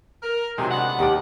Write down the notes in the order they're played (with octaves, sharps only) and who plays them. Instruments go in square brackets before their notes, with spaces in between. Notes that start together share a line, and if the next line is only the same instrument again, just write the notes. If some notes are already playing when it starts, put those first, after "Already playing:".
[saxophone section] A#4
[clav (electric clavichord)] C3 G#3 [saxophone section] D#3 F#3
[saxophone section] B3 D4 F#5
[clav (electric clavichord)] D#2 D#3 D5 [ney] G4